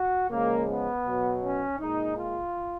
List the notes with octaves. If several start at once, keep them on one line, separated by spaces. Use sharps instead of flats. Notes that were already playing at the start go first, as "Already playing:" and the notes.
Already playing: F#4
C#3 F3 G#3 A#3
B3
B2 F#3
C#4
A#2 G#3 D#4
F4